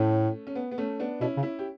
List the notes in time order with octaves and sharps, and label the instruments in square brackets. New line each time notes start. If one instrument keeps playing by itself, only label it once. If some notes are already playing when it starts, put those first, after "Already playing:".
Already playing: [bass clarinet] A2 [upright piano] A3 C#4
[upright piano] C#4
B3
B3
A3 C#4
B3 D4
[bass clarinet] B2 [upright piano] C#4 E4
[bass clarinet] C#3
[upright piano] C#4 E4
G4